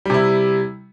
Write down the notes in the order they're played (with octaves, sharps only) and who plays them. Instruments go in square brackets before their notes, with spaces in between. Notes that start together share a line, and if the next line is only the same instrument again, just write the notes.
[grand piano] G3
C3
E4